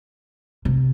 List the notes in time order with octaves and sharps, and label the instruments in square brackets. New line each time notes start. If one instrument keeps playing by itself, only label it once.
[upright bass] C3